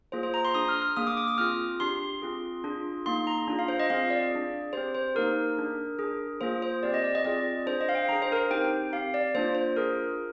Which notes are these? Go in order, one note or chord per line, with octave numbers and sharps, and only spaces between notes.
A#3 F4 G#4 C5
C5
A#5
C6
D4 G#4 D#6
F6
F6
A#3 D4 G#4 D#6
D6
D6
D#6
C4 F4 G#4 F6
D4 G4 C6
C4 F4 G#4
D4 F4 G#4
A#3 D#4 G#4 C6
A#5
D4 F4 G#4
F5
C5
D#5
C4 F4 G#4 F5
D5
D4 G#4
C4 G4 C5
C5
A#3 D#4 G4 A#4
D4 G#4
D4 G#4
A#3 F4 G#4 C5
C5
C4 G4 D5
D#5
D5
D#5
C4 F4 G#4 D5
D4 G#4 C5
D#5
F5
G5
D4 G#4 A#5
C5
A#4
C5
C4 D#4 G4 G5
C4 G4 F5
D5
A#3 D4 F4 C5
C5
D4 F4 G#4 A#4